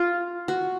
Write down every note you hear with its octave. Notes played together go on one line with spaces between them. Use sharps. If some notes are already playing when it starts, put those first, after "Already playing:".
Already playing: F4
F#4